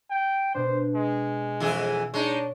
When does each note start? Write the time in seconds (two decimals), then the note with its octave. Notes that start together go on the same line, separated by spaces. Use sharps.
0.10 G5
0.55 B2 D4 C5
0.95 G#3
1.60 F2 E3 G#4
2.14 G#3 D4 D#4 C#5